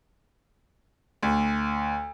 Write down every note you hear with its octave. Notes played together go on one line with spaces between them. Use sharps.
D2